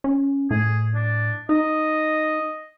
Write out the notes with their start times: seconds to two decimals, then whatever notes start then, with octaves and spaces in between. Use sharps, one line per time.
0.04 C#4
0.51 A2 G#4
0.94 D4
1.49 D#4 D#5